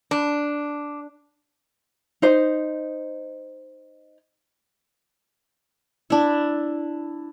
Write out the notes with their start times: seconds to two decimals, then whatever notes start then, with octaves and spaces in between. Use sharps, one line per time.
0.11 D4
2.22 D#4 C5
6.10 D4 E4